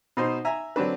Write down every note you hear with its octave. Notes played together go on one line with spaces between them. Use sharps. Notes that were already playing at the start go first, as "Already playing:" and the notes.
B2 D#4 C5
E5 G#5 A#5
D3 F#3 C4 D4 B4